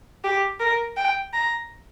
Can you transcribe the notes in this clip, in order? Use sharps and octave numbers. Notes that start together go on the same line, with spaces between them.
G4
A#4
G5
A#5